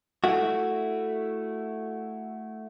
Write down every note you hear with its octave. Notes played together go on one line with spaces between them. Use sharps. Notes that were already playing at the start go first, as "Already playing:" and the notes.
A3 E4 F#4